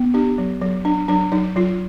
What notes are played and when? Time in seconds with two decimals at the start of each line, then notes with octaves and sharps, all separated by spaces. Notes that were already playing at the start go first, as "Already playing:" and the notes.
Already playing: B3
0.14 D4 G4
0.38 F#3
0.61 F#3
0.85 D4
1.08 F#3 D4
1.32 F#3 D#4
1.56 F#3 F4